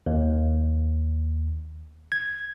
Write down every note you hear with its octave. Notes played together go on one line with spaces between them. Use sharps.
D#2
G#6